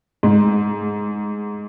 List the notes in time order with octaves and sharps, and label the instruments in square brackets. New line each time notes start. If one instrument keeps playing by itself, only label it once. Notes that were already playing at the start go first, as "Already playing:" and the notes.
[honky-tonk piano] G#2